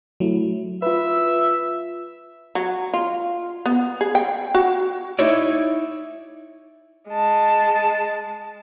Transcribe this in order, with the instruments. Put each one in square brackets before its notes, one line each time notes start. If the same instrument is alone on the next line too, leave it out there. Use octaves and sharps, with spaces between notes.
[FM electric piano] F#3 A3 E4
[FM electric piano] F4 B4 [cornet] E5
[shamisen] F#3
F4
B3
G#4
G5
F#4
[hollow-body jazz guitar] D#4 E4 C#5 D5
[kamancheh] G#3 A5